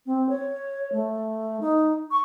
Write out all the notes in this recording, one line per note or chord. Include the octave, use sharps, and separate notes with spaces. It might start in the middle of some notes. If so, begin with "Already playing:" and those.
C4
C#5
A3
D#4
C#6